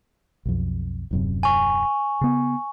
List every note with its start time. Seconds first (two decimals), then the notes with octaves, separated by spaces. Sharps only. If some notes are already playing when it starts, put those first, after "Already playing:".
0.46 B1 F2
1.11 D#1 F#2 C3
1.43 G#5 C#6
2.21 C#3 B3